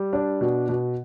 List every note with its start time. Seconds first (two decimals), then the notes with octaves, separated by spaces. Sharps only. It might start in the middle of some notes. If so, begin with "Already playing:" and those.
Already playing: G3
0.13 D4
0.41 B2
0.69 B2